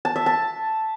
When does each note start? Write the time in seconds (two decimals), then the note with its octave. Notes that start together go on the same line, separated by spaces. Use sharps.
0.05 A5
0.16 E5
0.26 A5